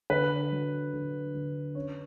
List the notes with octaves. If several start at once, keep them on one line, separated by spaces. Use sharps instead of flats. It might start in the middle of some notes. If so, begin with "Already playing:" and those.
D3 B4
F#3
D3
D3
C#4 C#5